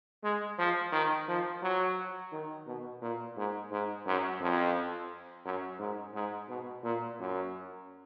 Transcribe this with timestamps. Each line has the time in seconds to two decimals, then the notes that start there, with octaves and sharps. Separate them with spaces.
0.24 G#3
0.59 F3
0.93 D#3
1.28 F3
1.63 F#3
2.32 D#3
2.67 B2
3.02 A#2
3.37 G#2
3.72 G#2
4.06 F#2
4.41 F2
5.45 F#2
5.79 G#2
6.14 G#2
6.49 B2
6.84 A#2
7.19 F#2